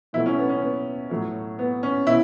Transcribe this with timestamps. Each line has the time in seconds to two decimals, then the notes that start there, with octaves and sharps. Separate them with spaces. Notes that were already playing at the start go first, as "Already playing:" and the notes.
0.13 B2 F#3 A3 E4
0.26 C#4
0.38 B3
0.49 C#4
0.62 B3
1.10 A2 F#3 A3
1.59 B3
1.83 C#4
2.06 B2 E4